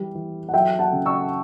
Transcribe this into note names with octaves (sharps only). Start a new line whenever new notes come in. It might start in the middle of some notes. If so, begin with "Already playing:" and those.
Already playing: E3 G3
E3
F#5
F#3 E5 G5
F#5 A5
C#3
C#6 E6